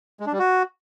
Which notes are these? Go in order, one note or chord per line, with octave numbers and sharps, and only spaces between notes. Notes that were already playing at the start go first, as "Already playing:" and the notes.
G#3
D4
G3
F#4